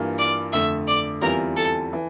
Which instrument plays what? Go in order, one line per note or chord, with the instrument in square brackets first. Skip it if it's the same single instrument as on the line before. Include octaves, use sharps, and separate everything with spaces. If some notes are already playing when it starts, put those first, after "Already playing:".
Already playing: [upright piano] G2 E3 A#3 F4 A#4
[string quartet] D5 D6
[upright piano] F2 D3 A3 [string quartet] E5 E6
[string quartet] D5 D6
[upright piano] E2 E3 G3 C4 F4 [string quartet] A#4 A#5
[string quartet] A4 A5
[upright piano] E3